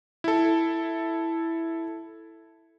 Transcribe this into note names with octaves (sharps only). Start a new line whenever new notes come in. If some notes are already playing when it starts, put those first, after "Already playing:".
E4 A4